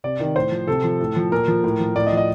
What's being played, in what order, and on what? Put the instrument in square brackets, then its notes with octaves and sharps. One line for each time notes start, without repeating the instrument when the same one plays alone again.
[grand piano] C3 D5
D#3
A2 C5
F3
C3 A4
F3
A2
F3
A#2 A#4
F3
A2
F3
A2 D5
D#5
F3
D#5